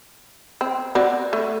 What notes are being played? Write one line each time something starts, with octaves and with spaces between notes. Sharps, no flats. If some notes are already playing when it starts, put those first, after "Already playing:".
C4
C4 F#4 D5
A3